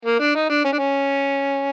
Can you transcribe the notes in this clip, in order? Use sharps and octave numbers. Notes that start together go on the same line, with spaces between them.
A#3
D4
D#4
D4
C#4
D4
C#4